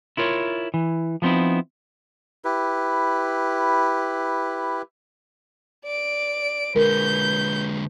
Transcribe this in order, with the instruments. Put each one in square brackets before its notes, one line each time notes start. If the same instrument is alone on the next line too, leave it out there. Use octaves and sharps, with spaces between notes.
[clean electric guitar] E4 F4 A#4 C#5
E3
F3 B3 C4 D#4 E4
[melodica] E4 G4 B4
[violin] D5 D7
[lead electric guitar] D3 G#3 [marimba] A#4 [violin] B4 G6